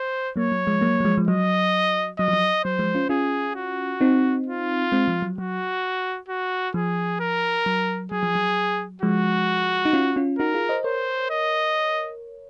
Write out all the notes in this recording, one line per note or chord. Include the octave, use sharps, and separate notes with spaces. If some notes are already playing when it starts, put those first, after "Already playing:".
Already playing: C5
F#3 A#3 C#5
F#3
F3 G#3
F#3 A#3
F#3
F3 G#3
F3
F#3 D#5
F#3 D#5
F3
F#3
F#3 C5
F3 G#3
C#4 F4
C#4 F4 G#4
F#4
C4 D#4
F4
G#3 C4
F3
F#3
F#3 F#4
F#4
F3 G#4
A#4
F#3
F#3 G#4
F3
F#3
F3 G#3 F#4
D#4
C#4 F4
C#4 F4
D#4 F#4 A#4
F4 G#4
C5 D#5
A#4 C5 C#5
D#5